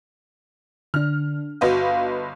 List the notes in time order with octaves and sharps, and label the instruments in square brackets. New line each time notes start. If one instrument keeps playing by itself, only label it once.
[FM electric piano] D3 D4 [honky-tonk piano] F6
[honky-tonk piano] G1 B4 D#5 [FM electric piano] F#4 F5